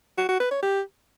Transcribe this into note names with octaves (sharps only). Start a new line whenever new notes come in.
F#4
F#4
B4
C#5
G4